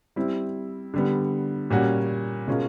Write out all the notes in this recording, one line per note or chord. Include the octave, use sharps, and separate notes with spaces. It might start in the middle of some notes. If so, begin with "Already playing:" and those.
G3 C4 E4
D3 G3 B3
A#2 G3 A#3 C#4 F#4
B2 G#3 C#4 F4 A#4